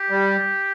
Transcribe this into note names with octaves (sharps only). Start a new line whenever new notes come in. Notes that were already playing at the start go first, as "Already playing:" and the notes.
Already playing: G4
G3